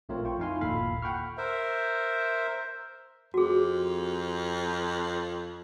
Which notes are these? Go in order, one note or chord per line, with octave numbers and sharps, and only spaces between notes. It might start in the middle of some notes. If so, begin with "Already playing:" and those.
A#1 A3 C4 F4 A#4 C#5
F4 G5 C#6
F2 D#4 E4 F5 G#5 C6
G1 D#2 A#2 A4 F5 B5
F#5 G5 B5 C#6 F6
A#4 C5 E5
F2 F#4 G#4